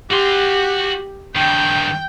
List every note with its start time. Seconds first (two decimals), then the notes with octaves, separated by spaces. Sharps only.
0.11 F#4 G4 C6
1.36 G2 D#3 G5